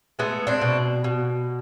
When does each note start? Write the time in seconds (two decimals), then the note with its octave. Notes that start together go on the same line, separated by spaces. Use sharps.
0.19 G#3 A3 B3
0.47 C4 D4
0.62 B2
1.04 B2